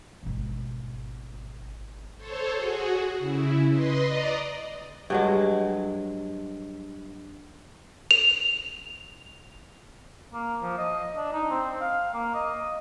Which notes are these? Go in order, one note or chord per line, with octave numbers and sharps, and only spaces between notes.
G#1 B2
A4 C5 C#5
F#4 G#4
C#3 E4
B4 D#5 C6
D5 D#5 A#5
G2 F#3 G#3
F7
A#3
F3
D#5
D4
D#4
C4
F5
A#3
D#5